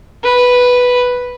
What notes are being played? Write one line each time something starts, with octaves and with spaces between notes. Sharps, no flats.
B4